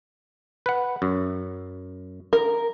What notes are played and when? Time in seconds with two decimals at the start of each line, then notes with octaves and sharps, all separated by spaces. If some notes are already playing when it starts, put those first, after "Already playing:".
0.66 B4 F#5
1.02 F#2
2.33 A#4